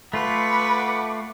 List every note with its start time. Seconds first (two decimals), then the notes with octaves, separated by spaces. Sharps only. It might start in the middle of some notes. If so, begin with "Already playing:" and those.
0.13 A3 F4 B4 F#5 C#6 D6